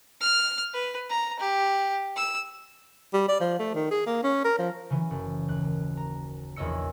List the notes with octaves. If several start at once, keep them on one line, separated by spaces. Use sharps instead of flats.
F6
B4
A#5
G4
E6
G3
D5
F3
A3
D#3
G#4
A#3
C#4
A#4
F3
C#3 E3 F#3
F#1
D#2 F#6
A#5
A#1 E2 C#5 D#5 E6 C#7